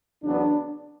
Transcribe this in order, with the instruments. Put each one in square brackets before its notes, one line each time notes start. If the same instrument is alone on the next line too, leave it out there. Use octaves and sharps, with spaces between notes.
[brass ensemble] E2 C#3 F#3 B3 D4